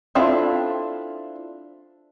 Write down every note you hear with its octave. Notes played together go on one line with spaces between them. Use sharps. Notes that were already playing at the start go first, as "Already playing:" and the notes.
C4 D4 E4 F4 A4